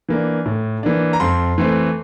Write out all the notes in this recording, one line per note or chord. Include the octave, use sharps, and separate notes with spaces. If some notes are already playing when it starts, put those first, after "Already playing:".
E3 A#3 D4
A2
E3 A#3 D4
A#5
F2 C6
E3 A3 C4